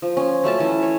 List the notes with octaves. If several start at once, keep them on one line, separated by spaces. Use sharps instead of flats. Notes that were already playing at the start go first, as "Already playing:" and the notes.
F3
C#4
F#3 A3 C#4 A5
E3
C#5